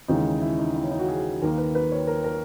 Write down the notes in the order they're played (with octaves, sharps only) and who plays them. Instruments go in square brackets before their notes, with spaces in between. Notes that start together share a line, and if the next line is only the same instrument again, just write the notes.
[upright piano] D#2 C#3 E3 G#3 D#4
E4
D#4
E4
C#4
D#4
F#4
G#4
D#2 D#3 A#3 A#4
B4
B4
C#5
A#4
A#4